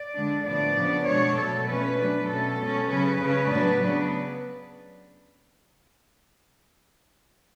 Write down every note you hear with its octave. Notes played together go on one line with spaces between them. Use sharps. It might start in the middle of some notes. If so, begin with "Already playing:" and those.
Already playing: D5
D3 G#3 D4
A2 F3 B3 D4 D5
C#3 F3 B3 D4
B2 G#3 D4 C#5
B2 F#3 A3 A4
F3 A3 C#4 B4
B2 F#3 A3 D4
B2 A3 C#4 A4
B2 G#3 C#4
C#3 F#3 C#4 B4
C#3 G#3 C#4
A2 F#3 B3 D4
C#3 F#3 B3 D4